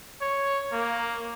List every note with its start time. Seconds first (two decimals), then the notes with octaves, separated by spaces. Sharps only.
0.21 C#5
0.73 A#3